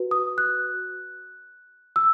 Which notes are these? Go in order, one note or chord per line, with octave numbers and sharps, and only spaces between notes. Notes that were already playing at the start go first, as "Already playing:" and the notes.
Already playing: F#4 B4
D#6
F#6
E6